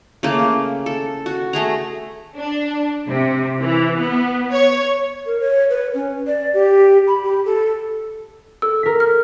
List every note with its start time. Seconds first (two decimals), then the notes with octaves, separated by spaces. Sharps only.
0.23 C#3 A3 A#3
0.86 A4
1.26 F#4
1.53 A3 G#4 A#5
2.37 D4
3.07 C3
3.60 E3
3.98 B3
4.51 C#5
5.26 A#4
5.40 C#5
5.70 B4
5.94 C#4
6.27 D5
6.54 G4
7.07 B5
7.23 G4
7.45 A4
8.62 A4 E6
8.83 A#4 B6
9.00 F6